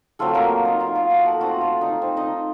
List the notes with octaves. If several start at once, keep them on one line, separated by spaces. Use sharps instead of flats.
F#3 A3 C4 F4 A4
A#3 A#4
D#4 D#5
F4 F5
F4 F5
F#4 F#5
A4 A5
A3 C4 F4 F#4 F#5
F4 F5
D#4 D#5
C4 C5
D#4 D#5